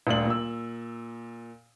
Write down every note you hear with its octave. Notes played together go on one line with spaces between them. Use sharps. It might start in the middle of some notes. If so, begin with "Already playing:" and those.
D#1 D2 D4 F#7
A#2 E6